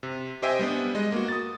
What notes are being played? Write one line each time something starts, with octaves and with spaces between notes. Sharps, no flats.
C3
G4 C5 D#5 E5 G5 G#5
G3 B3 D4
G#3 D#5
A#3 F#4
D#6 A6